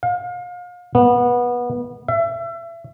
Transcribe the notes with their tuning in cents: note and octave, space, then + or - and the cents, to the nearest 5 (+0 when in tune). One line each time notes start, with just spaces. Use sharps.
F5 +35
B3 -20
E5 +30